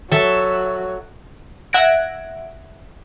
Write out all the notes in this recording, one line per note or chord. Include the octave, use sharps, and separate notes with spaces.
F#3 A4 E5
E5 F#5 F#6 G#6 A#6 D7